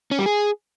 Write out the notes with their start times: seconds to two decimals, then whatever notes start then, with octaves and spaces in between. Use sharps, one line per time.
0.11 C#4
0.19 G3
0.26 G#4